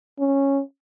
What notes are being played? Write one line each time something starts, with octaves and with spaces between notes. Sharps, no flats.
C#4